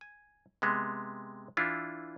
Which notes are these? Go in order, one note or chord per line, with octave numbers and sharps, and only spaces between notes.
G#5
C3 G#3 B3
E3 D4 E4 F4